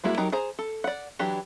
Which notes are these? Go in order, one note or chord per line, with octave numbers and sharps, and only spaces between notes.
G3 G#3 A#3 E4 F#4
F#3 D#4 G4 A#4 A#5
G#4 C5 A#5
A4
D5 F#5
E3 F#3 D4 G4